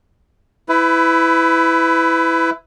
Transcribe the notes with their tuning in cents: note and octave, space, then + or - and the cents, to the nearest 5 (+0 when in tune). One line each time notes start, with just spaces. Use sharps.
E4 +0 B4 +25